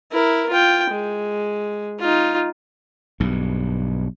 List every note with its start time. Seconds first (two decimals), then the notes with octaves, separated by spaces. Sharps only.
0.12 E4 A#4
0.50 F4 G5
0.91 G#3
2.00 D#4 F4
3.20 B1 G2